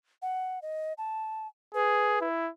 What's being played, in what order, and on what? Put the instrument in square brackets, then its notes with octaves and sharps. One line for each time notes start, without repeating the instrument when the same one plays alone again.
[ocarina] F#5
D#5
A5
[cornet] G#4 [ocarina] B4
[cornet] E4